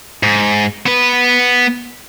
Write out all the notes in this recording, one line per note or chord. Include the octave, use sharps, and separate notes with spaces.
G#2
B3 B4